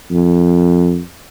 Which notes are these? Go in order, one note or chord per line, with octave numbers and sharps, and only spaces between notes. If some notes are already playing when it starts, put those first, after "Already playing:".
F2